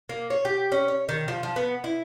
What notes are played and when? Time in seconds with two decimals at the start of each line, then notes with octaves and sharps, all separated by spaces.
0.09 A#3
0.30 C#5
0.45 G4
0.72 C#4
0.88 C#5
1.09 D#3
1.28 F3
1.43 F3
1.56 B3
1.84 E4